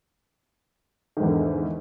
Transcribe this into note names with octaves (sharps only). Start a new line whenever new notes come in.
E2 G#2 D3 D#3